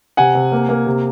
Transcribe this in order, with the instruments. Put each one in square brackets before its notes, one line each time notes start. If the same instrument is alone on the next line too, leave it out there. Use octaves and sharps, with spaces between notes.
[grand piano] C3 F#5 G#5
C3
A#3
A#3
C3